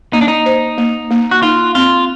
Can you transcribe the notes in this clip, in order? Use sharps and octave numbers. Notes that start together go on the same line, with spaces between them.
A#3 D#4
D4
D#4
C5
A#3
A#3
F#4
D#4 F4
C4 F4